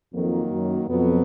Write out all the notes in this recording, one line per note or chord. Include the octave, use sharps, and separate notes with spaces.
F2 D#3 F#3 A#3
F#2
F2 B2 F#3 B3